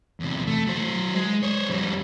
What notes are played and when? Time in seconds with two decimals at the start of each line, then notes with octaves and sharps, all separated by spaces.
0.20 E2 C3
0.47 A3
0.67 F#3 C5
1.14 G#3
1.43 C5 C#5
1.68 F2 G3